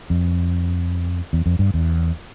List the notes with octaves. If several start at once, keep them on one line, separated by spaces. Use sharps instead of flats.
F2
E2
F2
G2
E2